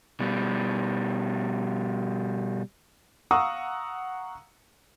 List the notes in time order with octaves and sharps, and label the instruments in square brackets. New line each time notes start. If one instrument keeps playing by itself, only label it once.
[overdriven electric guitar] B2 G3
[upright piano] F5 F#5 A#5 C#6 D#6 E6